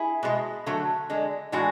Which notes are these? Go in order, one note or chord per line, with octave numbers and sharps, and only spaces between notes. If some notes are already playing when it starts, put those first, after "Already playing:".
Already playing: E4 G#4
B2 G#3
D3 F#3 A3
D3 G#3
A2 E3 G#3 D4 F#4